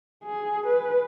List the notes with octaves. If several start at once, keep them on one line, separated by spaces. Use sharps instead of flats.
G#4
B4